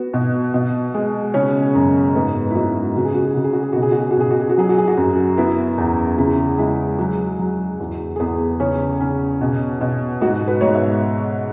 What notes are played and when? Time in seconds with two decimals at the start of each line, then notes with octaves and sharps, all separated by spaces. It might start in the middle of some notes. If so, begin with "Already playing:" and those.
Already playing: B3 F#4
0.14 B2
0.54 B2
0.94 G#3
1.34 C#3 C#4 C#5
1.75 F#2
2.15 G#2 B3 B4
2.51 E4
2.55 G#2 F#4
2.96 C#3 F#4
3.05 G#4
3.14 F#4
3.25 G#4
3.34 C#3 F#4
3.44 G#4
3.53 F#4
3.63 G#4
3.73 B2 F#4
3.82 G#4
3.92 F#4
4.01 G#4
4.11 F#4
4.17 B2 G#4
4.31 F#4
4.40 G#4
4.50 F#4
4.58 F#3 G#4
4.69 F#4
4.78 G#4
4.88 F#4
4.97 F#2
5.37 B3 E4
5.78 E2
6.18 C#3 E4
6.58 G#3 E4
6.98 F#3 F#4
7.39 F#3
7.80 E2
8.16 G#4
8.20 E2 B3 B4
8.60 C#3 C#4 C#5
9.01 C#4
9.41 B2
9.81 B2
10.21 G#2 F#4 F#5
10.48 B4
10.61 G#2 C#5
10.74 E5